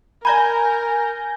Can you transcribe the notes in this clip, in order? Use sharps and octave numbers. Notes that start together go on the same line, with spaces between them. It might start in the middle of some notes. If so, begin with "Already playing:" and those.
A#4 D5 G#5 A#5 B5 G6 A#6